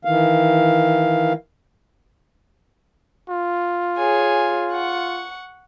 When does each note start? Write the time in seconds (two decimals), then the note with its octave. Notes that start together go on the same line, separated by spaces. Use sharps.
0.05 D#3 E3 F5
3.29 F4
3.97 G#4 C#5 G#5
4.72 F#5 C#6